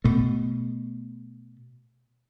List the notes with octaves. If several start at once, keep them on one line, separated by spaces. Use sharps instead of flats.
B2 A3